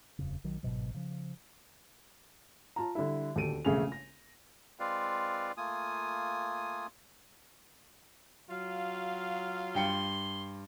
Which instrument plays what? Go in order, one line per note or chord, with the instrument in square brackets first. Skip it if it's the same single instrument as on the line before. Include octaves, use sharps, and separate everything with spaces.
[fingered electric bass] D#1 F2 C#3
A#1 D#3 F#3
G1 G#2 B2 F#3
C#3 F3
[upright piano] F4 A5 A#5
D3 G3 E4
D#1 D2 G4 A4 D7 D#7
E1 A#1 C#3 A3 G#4 F7
A#6
[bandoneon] G#3 C4 F4 B4 D5 F5
A3 A#3 F4 G#5 D#6
[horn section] F#3 F5 [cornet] F4
[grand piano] G2 G5 C#7 [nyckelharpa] C6